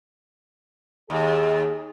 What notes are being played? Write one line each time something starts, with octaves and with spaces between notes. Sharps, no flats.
D#2 G#4